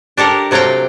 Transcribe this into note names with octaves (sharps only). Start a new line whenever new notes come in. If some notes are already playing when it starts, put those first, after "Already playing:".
D4 G4 A4 A#4
C3 F#3 A3 F5 G5